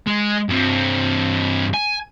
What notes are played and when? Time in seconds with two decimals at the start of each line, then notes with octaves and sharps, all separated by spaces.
0.07 G#3
0.49 G2 C4
1.74 G#5